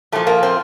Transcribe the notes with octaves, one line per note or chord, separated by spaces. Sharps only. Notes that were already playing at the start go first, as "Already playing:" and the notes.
A#2 F3 A3
A#3
C4